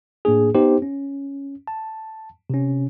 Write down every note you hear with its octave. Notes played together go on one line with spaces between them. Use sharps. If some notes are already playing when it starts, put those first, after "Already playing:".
A2 A#3 D4 G#4
B3 D#4 G4 C5
C#4
A5
C3 C#4